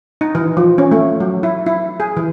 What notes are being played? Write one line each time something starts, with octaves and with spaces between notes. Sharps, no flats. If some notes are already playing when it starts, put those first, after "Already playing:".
D#4
E3
F3
C#4
A3
F#3
E4
E4
G#4
E3